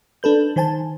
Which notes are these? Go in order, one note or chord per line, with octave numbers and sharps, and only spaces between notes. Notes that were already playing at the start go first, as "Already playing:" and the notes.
D4 A4 B4 G6
D#3 C5 G#5 A5